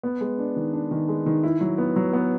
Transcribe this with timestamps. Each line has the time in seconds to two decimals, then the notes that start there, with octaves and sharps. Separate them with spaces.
0.03 B3
0.21 G#3
0.38 D4
0.56 D#3
0.73 D4
0.91 D#3
1.09 G#3
1.26 D#3
1.43 E4
1.61 F#3
1.78 B3
1.96 F#3
2.13 B3